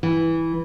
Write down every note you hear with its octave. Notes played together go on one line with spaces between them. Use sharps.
E3